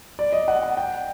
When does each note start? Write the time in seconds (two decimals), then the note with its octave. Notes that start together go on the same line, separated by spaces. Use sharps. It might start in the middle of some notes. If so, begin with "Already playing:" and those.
0.19 D5
0.33 D#5
0.48 F#5
0.63 F#5
0.77 G5